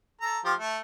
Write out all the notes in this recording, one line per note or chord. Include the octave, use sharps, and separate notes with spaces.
A4 A#5
F3 F4 G4
A3